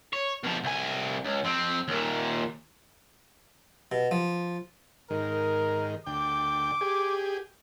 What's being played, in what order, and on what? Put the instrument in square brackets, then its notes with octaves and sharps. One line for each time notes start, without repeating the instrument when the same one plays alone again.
[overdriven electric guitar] C#5
B2 F3
C2 G#5
C#2
F2 C4
D#2 A#2
[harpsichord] B2
F3
[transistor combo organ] G#2 D#3 [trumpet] A#4
[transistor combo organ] D2 G5 [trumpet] D6
[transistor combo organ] G4 G#4